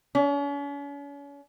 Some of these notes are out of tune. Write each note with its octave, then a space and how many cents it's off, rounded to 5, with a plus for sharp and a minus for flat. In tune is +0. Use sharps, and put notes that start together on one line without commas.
C#4 +40